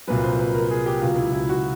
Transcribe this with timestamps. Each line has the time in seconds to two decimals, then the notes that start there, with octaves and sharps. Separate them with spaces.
0.07 C2 A#2 F#3 B4
0.24 C5
0.39 B4
0.55 A#4
0.71 G#4
0.86 G4
1.02 C#2 B2 F#3 F4
1.18 E4
1.33 E4
1.49 F#4